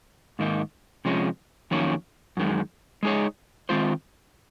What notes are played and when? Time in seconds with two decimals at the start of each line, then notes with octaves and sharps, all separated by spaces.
0.39 G#2 D#3 A#3 D#4
1.05 C3 F3 G#3 C#4
1.71 F2 D#3 F#3 A#3 C#4
2.37 F#2 D#3 G#3
3.03 G#3 D#4 G#4 C#5
3.69 D#3 G#3 C4 F4 C5